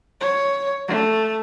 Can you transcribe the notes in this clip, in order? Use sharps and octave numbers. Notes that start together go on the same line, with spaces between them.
C#5
A3